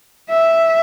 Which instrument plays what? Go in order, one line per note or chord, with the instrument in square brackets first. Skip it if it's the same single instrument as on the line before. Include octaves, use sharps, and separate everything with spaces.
[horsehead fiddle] E5